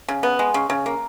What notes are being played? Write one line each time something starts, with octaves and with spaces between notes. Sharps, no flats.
C#3
B3
G#3
C#3
C#3
A#3